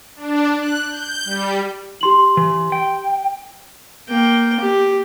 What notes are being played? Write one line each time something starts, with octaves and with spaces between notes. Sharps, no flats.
D4
F#6
G6
G3
G4 C6 F#7
E3
G5
A#3 G5
G4